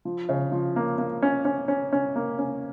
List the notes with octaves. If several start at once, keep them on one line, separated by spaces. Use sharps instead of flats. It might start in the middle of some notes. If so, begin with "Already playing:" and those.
F3
C#3
F3
A#3
A#3
C#4
C#4
C#4
C#4
A#3
C#4